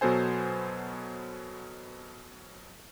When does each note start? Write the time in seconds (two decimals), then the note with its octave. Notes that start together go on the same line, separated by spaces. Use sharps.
0.01 B2 F#3 B3 A4 C5 G#5